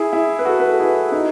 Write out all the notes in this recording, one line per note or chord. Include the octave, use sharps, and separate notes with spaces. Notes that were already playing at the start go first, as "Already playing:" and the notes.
Already playing: E4 G#4
E4 G#4
B4
F#4 A4
B4
A4
E4 G#4
D#4 F#4